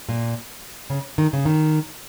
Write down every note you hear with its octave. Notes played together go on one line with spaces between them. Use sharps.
A#2
C#3
D#3
C#3
D#3